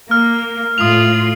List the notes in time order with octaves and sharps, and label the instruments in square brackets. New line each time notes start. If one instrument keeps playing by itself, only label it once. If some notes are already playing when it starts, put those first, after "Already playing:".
[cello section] A#3 [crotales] F6
[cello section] A2 F4 [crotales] D#6 F7